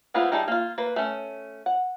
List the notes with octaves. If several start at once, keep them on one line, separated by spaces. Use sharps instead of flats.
G#3 B3 E4 F4 C5
G3 D#4 E4 G#4 A5
A#3 F4
A#3 B4
A3 C#4
F#5